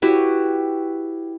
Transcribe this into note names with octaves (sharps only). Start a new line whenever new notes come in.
E4 F#4 G4 B4